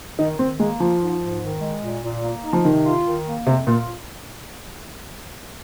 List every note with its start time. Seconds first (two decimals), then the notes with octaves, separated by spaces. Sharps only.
0.19 D#3 D#4
0.39 D#3 C4
0.59 G#3 A#3
0.80 F3 F4
1.00 G#2
1.21 G#2
1.42 D#3
1.61 G#3
1.82 A#2
2.04 A#2
2.24 A#3
2.44 D#4
2.53 F3
2.65 C3 D#3
2.86 F4
3.05 D#3
3.26 A#3
3.46 F2 C3
3.67 A#2 F4